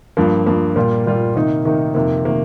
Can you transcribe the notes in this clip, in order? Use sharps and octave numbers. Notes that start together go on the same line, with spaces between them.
G2 F3 A#3
G2 F3 A#3
A#2 G3 A#3 F4
A#2 G3 A#3 F4
C3 D#3 A#3 D#4
C3 D#3 A#3 D#4
F2 C3 D#3 A#3
C3 D#3 A#3